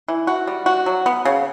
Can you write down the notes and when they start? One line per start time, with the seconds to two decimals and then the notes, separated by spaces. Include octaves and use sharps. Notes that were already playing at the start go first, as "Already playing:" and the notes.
0.08 E3
0.27 F#4
0.47 G3
0.66 F#4
0.86 F#3
1.06 B3
1.25 C#3